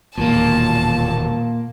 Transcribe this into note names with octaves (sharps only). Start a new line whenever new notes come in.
E1 D#2 A#2 A#3 A5